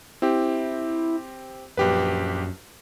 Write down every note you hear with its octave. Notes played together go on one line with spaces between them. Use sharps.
C4 E4 G4
A#1 F#2 G4 B4